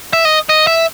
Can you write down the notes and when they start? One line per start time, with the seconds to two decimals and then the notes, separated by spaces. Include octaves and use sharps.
0.13 E5
0.25 D#5
0.49 D#5
0.67 E5